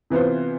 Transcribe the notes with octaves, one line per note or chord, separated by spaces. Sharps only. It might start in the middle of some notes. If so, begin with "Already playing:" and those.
C3 E3 B3 F4 C5